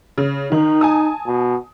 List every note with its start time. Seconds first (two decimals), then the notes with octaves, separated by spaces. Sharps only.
0.18 C#3
0.52 D#3 D#4
0.81 G#5 A5 D#6
1.27 B2